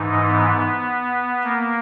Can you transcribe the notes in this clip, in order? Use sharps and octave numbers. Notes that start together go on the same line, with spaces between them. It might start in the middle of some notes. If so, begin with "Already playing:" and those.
Already playing: G#2 E3 D#4
B3
A#3